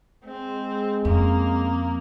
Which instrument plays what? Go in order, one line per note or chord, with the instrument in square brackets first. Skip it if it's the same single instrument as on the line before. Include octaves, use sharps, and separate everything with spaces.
[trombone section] G#3 [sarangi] C4
[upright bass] F2 [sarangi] A#3 [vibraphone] C4 C#4 D#6